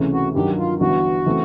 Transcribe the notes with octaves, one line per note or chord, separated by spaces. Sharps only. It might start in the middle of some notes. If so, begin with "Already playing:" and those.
Already playing: C#2 C3 E3 A3 C#4
F#4
G2 D#3 F#3 G4
F4
G1 G2 E3 F#4
C#3 E3 A3 C4